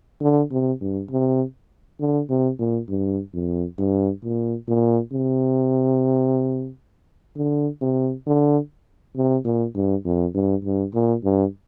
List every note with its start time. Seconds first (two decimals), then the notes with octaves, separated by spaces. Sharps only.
0.21 D3
0.51 C3
0.81 G2
1.11 C3
2.00 D3
2.29 C3
2.59 A#2
2.89 G2
3.34 F2
3.79 G2
4.24 A#2
4.68 A#2
5.13 C3
7.36 D3
7.81 C3
8.26 D3
9.16 C3
9.45 A#2
9.75 G2
10.05 F2
10.35 G2
10.64 G2
10.94 A#2
11.24 G2